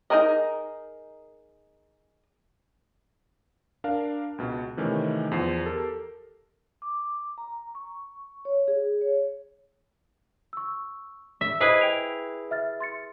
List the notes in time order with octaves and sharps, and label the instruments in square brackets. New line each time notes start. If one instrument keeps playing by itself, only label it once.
[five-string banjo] D#4 F#4 G#4 A#4 D#5
[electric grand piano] D4 A#4 F5
C#2 B2
C3 D#3 E3 A3 C#4
E2 F3 C7
G4 A4 A#4
[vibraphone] D6
A#5
C#6
C#5
G#4
C#5
[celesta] C#6 E6
[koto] E5
[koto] E4 G#4 B4 [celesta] C5 D#5 F#6
[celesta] G5 D7 F7
E5 F6 A6
C6 A6 C#7